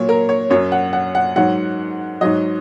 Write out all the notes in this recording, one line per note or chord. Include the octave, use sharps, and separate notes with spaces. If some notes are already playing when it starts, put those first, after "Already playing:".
Already playing: A#2 F#3 C#5
A#4
C#5
F#2 F#3 C#5
F#5
F#5
F#5
G#2 F#3 F#5
G#2 F#3 D#5